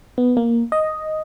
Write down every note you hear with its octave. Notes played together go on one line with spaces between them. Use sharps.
B3
A#3
D#5